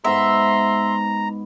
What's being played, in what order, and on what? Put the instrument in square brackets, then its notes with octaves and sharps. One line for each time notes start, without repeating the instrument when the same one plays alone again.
[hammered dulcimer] G#2 B3 [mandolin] E5 [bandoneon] A#5 [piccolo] C6